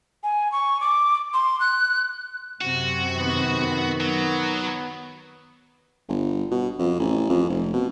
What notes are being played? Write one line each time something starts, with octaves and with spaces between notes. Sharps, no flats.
G#5
C#6
D6
C6
F#6
F#2 C3 C4 F#4
D#3 B3
F#3
G1
B2
F2
A1
F2
F1
B2